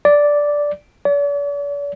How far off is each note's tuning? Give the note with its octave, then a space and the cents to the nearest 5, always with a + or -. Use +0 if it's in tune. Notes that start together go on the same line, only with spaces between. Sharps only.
D5 -5
D5 -45